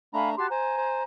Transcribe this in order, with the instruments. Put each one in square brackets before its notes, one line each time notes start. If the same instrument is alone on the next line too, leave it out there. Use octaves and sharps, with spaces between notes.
[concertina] A3 D4 A#5 [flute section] F5 G#5 B5
[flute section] F#4 A5 C6 [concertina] G4
[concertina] C5 [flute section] G#5 A#5
[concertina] C5